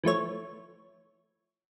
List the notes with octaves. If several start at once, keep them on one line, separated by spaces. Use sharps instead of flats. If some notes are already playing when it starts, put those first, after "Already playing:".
E3 F3 A3 C#5